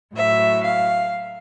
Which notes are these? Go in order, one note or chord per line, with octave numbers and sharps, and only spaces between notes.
A2 F#3 E5
F5